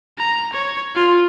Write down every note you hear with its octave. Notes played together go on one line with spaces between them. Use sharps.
A#5
C#5
F4